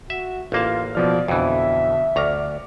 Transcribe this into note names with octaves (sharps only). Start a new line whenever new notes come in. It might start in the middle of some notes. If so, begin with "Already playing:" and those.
F#4 E5
A1 A#3 F4 A5
B2 F3 D5 F6
F2 B2 D3 E3 E5
D2 A#5 C#6 D6 F6